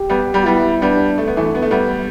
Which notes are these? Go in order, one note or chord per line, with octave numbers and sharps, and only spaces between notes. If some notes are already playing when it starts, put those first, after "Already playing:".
Already playing: G4
G3 B3
G3 B3
G3 B3 E4
G3 B3 D4
A3
B3
E3 A3
B3
A3
G3 B3